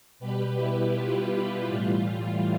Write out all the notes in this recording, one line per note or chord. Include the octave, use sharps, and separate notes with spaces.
B2 G3 G4 B4
E4 G4
F4
A2 E3 G3 F4